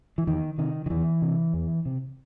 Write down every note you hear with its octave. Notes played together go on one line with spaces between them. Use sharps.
E3
E2 D#3
C3 D#3
D#3
E2 E3
C3
E2
C3